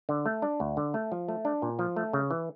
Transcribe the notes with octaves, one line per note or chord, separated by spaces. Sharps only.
D3
A3
D4
D2
D3
A3
F3
A3
D4
A#2
F3
A3
C#3
E3